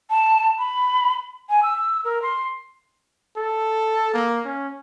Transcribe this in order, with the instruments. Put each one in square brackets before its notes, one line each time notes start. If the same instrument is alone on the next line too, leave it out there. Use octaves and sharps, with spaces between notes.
[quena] A5
B5
G#5
E6
A#4
C6
[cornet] A4
A#3
C#4